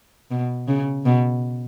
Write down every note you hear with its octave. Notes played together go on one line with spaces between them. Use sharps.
B2
C#3
B2